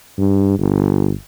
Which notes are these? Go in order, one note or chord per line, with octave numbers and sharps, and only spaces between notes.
G2
G1